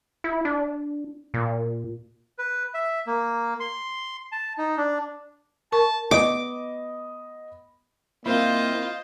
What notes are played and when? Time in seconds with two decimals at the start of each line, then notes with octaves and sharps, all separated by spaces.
0.24 E4
0.45 D4
1.34 A#2
2.38 B4
2.74 E5
3.07 A#3
3.60 C6
4.32 A5
4.58 D#4
4.77 D4
5.72 A#4 A5 C#6
6.11 B3 D#5 D6
8.26 A#3 C4 E4 F4 C5 D#5